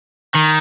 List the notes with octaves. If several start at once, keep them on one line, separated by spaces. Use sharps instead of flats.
D#3